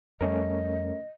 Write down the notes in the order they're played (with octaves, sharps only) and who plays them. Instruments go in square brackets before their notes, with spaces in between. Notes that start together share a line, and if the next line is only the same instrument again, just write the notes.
[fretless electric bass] F2 G3 [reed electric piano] A3 C#4 A#4 [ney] D#5